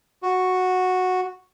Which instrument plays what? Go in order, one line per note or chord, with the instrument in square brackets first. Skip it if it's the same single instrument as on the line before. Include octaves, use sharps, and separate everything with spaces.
[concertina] F#4